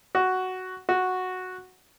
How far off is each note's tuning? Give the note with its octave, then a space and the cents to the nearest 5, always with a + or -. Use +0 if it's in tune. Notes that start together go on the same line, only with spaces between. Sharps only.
F#4 +5
F#4 -5